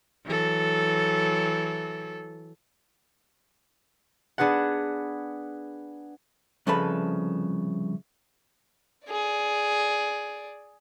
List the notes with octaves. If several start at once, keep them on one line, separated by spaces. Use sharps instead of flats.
E3 F#3 A4
B3 D4 G#4 B4 F#5
C2 C#3 F3 A4 B4 B5
G#4 D5